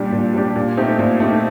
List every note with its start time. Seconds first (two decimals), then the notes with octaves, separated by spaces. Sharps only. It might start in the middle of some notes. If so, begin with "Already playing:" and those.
Already playing: A#2 G3 D4 G4
0.12 A#2
0.33 G3 D4 G4
0.55 A#2
0.77 A3 C4 D#4 G4
0.99 A#2
1.20 A3 C4 D#4 G4